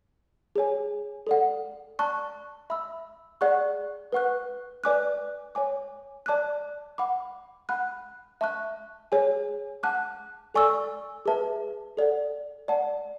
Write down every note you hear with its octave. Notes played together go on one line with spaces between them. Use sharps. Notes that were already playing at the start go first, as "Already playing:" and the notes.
G#4 C#5 G#5
A4 D5 F#5
D5 A5 C#6 F#6
E5 B5 E6
G#4 D5 F#5 C#6 F#6
B4 F#5 C#6 F#6
B4 D5 G#5 D6 F#6
C#5 G#5 D6
D5 A5 D6 F#6
F#5 B5 D6
F#5 B5 F#6
E5 A5 C#6 F#6
G#4 C#5 G#5
F#5 A5 D6 F#6
A4 D5 G#5 C#6 E6
G#4 B4 E5 A5
A4 D5 F#5
D5 F#5 A5